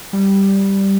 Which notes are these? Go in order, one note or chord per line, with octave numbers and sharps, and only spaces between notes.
G3